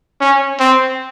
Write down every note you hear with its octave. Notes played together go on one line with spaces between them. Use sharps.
C#4
C4